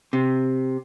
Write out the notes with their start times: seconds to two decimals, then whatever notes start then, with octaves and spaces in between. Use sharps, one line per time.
0.13 C3